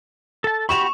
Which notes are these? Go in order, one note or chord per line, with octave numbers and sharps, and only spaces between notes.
A4 A5
F#4 G4 B5 C#6 E7 F7